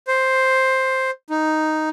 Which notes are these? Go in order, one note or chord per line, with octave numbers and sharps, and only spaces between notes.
C5
D#4